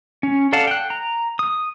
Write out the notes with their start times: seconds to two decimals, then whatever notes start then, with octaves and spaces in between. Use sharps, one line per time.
0.23 C#4
0.53 A4 D5 F5 F#5 A5
0.67 G5 F#6
0.90 A#5
1.39 D#6